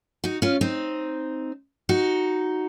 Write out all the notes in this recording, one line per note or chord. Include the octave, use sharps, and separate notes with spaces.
D#4 F#4
C#4 F4
C4 D#4
D#4 F#4